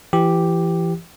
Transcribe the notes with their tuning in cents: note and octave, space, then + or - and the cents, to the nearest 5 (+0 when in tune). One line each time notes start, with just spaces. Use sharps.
E3 +30 G4 +0